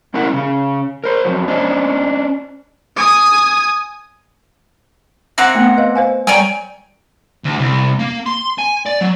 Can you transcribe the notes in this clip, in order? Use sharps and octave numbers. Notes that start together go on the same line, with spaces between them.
G3 C#4 E4 A#4 F#5
C#3 C#4
A#4 C5
F2 F3 F#3
C#4 D4 C5 D#5
G#5 D#6
A#3 C4 E5 F#5
A3 B3
B4 D#5 F5
C5 F5 G#5
G3 C#5 D5 G5 G#5 A#5
D2
C2
A#3
C6
G#5
D5
F#3